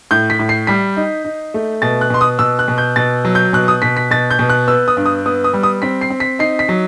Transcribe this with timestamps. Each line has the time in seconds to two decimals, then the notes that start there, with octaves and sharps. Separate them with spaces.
0.11 A2 G6
0.30 B6
0.39 A2
0.49 C7
0.67 G3 B6
0.97 D#4
1.24 D#4
1.54 A3
1.82 B2 A6
2.01 F#6
2.10 B2 C6
2.21 D#6
2.39 B2 E6
2.59 F#6
2.68 B2
2.78 G6
2.96 B2 A6
3.25 F#3
3.35 G6
3.53 B2 F#6
3.68 D#6
3.82 B2 B6
3.97 B6
4.11 B2 A6
4.31 G6
4.39 B2
4.50 F#6
4.67 B3 E6
4.88 D#6
4.97 G2
5.06 D#6
5.26 B3 D#6
5.44 D#6
5.54 G3
5.63 D#6
5.82 C4 B6
6.01 C7
6.10 C4
6.20 B6
6.39 D#4 C7
6.59 B6
6.69 F#3